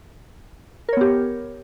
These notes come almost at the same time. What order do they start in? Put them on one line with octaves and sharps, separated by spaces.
A#4 C#5 B3 G4